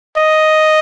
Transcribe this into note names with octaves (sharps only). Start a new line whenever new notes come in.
D#5